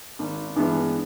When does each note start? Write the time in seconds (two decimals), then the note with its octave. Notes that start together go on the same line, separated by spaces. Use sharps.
0.19 G#1
0.56 G2 E3 G#3 B3